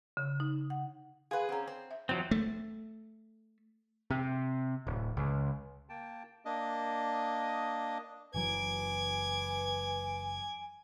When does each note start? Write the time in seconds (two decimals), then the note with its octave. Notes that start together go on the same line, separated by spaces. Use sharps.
0.17 C#3
0.40 D#4
0.70 F#5
1.31 G#4 B4 F5 F#5 C6
1.49 C4 C#4 G#4 F#5 A#5
1.67 C4
1.91 E5
2.09 A2 F3 F#3 C4
2.31 A3
4.11 C3
4.87 D1
5.17 C#2
5.89 A#3 G5 A5
6.45 A#3 D4 D#5
8.34 F#1 E3 F#3 B4 G#5 D6 G#6